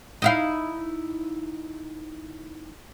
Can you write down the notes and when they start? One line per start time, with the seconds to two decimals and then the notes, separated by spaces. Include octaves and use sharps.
0.22 D#4 E4 F5